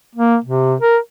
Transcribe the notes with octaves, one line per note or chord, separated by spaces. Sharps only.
A#3
C3
A#4